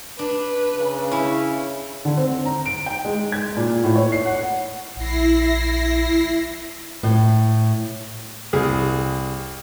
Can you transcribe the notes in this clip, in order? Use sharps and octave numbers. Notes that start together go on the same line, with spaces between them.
D4 B4
C#3
C#4 E4
D3
C4
A#5
D7
G5
G#3
G#6
A#2
A2
C#5
C7
F#5
A#1 E4 A#6 C7
A2
C2 G#4